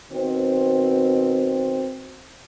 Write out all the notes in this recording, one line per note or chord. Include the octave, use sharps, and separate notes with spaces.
B2 D#3 C4